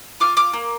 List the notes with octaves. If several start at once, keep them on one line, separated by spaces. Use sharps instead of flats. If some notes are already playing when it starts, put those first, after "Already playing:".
F4 D6 F6
D6 F6
A#3